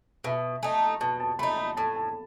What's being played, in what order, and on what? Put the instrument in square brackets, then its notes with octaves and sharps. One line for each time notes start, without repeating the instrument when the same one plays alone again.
[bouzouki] B2 [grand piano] E5
[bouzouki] A3 D#4 [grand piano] G#5
[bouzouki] B2 [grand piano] A5
[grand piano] A5
[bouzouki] A3 D#4 [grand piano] B5
[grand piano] B5
[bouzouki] A2 [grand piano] A5
[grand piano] A5